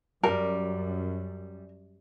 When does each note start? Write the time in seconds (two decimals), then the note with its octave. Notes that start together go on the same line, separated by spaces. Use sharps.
0.23 F#2 G3 A#4